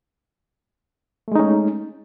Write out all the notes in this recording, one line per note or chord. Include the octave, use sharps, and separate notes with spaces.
G#3 A3 C#4 D#4